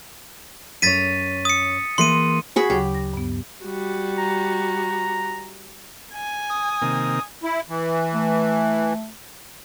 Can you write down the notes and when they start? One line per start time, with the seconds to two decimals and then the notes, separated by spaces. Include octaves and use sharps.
0.82 F#2 C#5 A6 B6 D#7
1.45 D#6 C#7
1.98 E3 G#3 A#3 C6 D#7
2.56 F#4 G#4 B5
2.70 D2 C#3 F#3 G4
2.95 A#6
3.14 G2 B3
3.64 G3 F#4
4.18 A#5
6.14 G#5
6.50 D#6
6.82 C3 D#3 A#3
7.43 E4
7.69 E3
8.14 A3